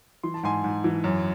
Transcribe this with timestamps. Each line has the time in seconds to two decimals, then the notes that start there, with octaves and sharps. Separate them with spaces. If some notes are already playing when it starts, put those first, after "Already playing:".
0.23 E3 C6
0.34 A5
0.43 G#2 G#5 C6
0.64 G#2
0.84 E3
1.04 F#2